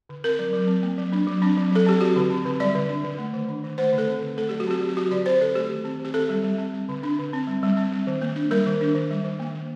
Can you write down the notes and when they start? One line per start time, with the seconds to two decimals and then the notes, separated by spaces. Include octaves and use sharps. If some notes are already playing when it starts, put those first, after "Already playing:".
0.09 D3
0.24 C4 A#4
0.39 F#3
0.53 F#3
0.67 C4
0.83 A#3
0.98 F#3
1.12 D4
1.27 F#3
1.42 C4 D4
1.57 F#3
1.72 F#3 A4
1.87 C4 G4
2.01 F#3 F#4
2.16 D3
2.30 C4
2.45 D3
2.60 G3 D5
2.75 D3
2.89 D4
3.04 D3
3.18 A3
3.34 D#3
3.49 D4
3.64 D#3
3.78 A3 C5
3.93 D3
3.98 A4
4.07 C4
4.22 D3
4.37 A3 A4
4.49 F#3 G4
4.60 F#4
4.67 C4 G4
4.81 F#3
4.89 G4
4.97 F#3 F#4
5.11 D3 D5
5.26 C4 C5
5.40 D3 A4
5.55 A3 G4
5.71 D#3
5.85 C4
5.99 D#3
6.05 G4
6.14 C4 A4
6.29 G3
6.44 G3
6.58 C4
6.74 G3
6.89 D3
7.03 D4
7.19 D3
7.33 C4
7.47 G3
7.63 G3
7.77 C4
7.92 G3
8.07 D#3
8.22 A#3
8.36 D4
8.51 G3 A#4
8.66 D#3
8.81 D4
8.95 D#3
9.10 G3
9.24 D#3
9.40 A#3
9.55 D#3